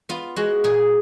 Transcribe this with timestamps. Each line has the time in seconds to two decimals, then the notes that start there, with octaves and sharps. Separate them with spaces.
0.09 B3 F4
0.36 G#3 F#4
0.64 A#2 G#4